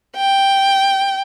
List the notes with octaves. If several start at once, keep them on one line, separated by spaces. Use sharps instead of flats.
G5